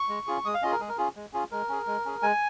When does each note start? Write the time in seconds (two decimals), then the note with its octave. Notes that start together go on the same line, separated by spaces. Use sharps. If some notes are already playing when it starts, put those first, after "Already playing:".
Already playing: C#6
0.09 G#3
0.27 C#4 F4 G#4
0.45 G#3 D#6
0.54 F5
0.62 C#4 F4 G#4 D#5
0.72 A#4
0.80 G#3 G#4
0.89 A#4
0.98 C#4 F4 G#4
1.16 G#3
1.33 C#4 F4 G#4
1.51 G#3 A#4
1.69 C#4 G#4
1.87 G#3
2.05 C#4 G#4
2.22 G#3 G#5